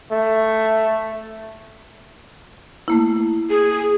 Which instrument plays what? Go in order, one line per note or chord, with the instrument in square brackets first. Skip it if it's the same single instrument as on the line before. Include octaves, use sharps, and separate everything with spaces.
[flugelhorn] A3
[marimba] A3 A#3 E4
[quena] G#4